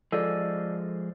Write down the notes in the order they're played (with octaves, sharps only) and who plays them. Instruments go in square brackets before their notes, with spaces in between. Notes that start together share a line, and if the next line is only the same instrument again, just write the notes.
[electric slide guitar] F3 G#3 [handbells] A4 D5